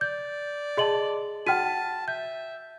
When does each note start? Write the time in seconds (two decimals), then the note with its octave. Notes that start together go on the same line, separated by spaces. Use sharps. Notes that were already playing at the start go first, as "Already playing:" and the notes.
0.01 D5 G6
0.77 G#4 D#5 A5 C6 F#7
1.47 F#4 F#5 G5 A5 F6 D#7
2.08 E5 G6